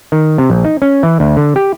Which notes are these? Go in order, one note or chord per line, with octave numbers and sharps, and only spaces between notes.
D#3
C3
A#1
D#4
C#4
E3
D2
D3
G4